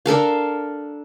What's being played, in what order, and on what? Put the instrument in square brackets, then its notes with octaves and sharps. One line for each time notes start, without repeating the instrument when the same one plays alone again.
[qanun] D4 A4 A#4 F5